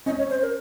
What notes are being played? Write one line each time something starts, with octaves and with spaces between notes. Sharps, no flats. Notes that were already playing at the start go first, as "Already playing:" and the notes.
C#4 D#5
C#5
C5
A#4